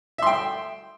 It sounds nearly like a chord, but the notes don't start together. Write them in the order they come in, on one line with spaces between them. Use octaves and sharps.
E5 C6 G5